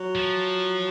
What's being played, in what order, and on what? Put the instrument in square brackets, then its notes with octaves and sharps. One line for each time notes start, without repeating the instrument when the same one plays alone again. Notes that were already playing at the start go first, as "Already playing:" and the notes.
Already playing: [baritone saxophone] F#3
[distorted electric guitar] F3